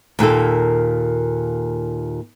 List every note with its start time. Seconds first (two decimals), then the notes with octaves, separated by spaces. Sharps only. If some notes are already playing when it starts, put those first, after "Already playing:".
0.19 D#2 A#2 A#3 A4